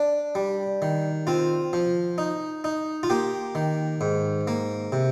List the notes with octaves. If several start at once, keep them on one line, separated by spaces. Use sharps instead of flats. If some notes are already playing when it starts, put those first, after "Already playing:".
Already playing: D4
G3
D#3
C4 F4
F3
D#4
D#4
F4
A#3 G4
D#3
G#2
A#3
C3